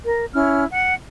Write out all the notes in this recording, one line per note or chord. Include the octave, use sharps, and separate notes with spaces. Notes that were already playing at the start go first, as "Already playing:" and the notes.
A#4
C#4 E4 F6
F#5